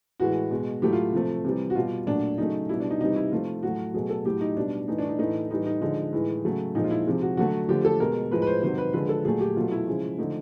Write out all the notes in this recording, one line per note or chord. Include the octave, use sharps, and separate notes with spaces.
A2 E3 G#3 F#4
B2 G#3
A2 F#3 A3 G4
F4
C3 F3 A3
C3 E3 G3
F#4
B2 G3 F4
A#2 F#3 A3 D4
C#3 F#3 A3 D#4
B2 G3 E4
D4
D#4
C3 E3 G3 D#4
E4
C3 F3 A3 F4
A2 F#3 A3 F#4
B2 F#3 A3 G#4
A4
A2 F#3 A3 G4
D#4
B2 G3 D4
A2 E3 A3 D#4
D4
D#4
A2 E3 A3 D#4
A2 E3 G3 D#4
D#4
D3 F3 G#3 D#4
A2 E3 G#3
C#3 F#3 A3
A#2 F3 G#3 D#4
F4
E4
C3 F3 G#3
F#4
D3 F#3 A3 F#4
D3 F3 A3 G4
A4
B2 G#3 A#4
A2 F3 G#3 B4
B4
C5
C3 D#3 F#3 C5
B4
D3 F3 G#3 B4
A4
A#2 F#3 A3 G#4
G4
B2 F#3 A3 F4
E4
C#3 F3 G#3
D3 F3 A3 D#4